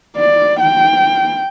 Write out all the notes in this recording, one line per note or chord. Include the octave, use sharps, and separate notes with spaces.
D5
G5